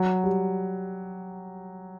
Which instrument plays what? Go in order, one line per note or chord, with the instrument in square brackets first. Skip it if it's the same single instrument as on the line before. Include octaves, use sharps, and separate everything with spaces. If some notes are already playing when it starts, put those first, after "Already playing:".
Already playing: [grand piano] F#3
G3